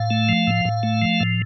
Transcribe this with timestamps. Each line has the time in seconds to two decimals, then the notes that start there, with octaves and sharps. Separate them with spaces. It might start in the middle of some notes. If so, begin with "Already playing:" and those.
Already playing: A2 F5
0.11 A3
0.29 F3
0.47 A2
0.65 A2
0.83 A3
1.02 F3
1.20 A2